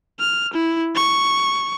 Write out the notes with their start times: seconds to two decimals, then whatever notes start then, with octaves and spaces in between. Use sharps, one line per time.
0.19 F6
0.53 E4
0.95 C#6